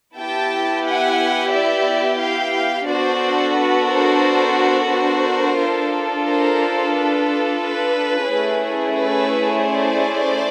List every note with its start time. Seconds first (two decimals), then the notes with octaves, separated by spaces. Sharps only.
0.18 B3 E4 G4 G5 A5
0.85 F#5 G#5
1.52 D5 E5
2.19 F5 G5
2.87 B3 D4 F#4 A4 C5 D5
3.56 B4
3.88 A#4 C5
4.89 A#4 C5
5.58 D4 F4 A4
6.24 A#4 C5
6.93 B4
7.59 B4
8.27 A3 C#4 E4 G#4
8.96 B4
9.63 C5 D5